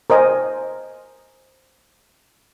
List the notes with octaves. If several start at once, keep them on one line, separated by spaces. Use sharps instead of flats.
A#4 C5 D#5 G#5